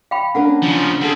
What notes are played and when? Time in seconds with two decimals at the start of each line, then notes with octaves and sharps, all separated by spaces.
0.11 F5 G5 B5
0.35 A#3 C#4 D4 A#4 B4 F#5
0.63 C#3 F3
1.01 G3 C4 G#4 A4 F#5